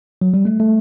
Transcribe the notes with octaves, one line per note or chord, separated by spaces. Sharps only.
F#3
G3
A3
A3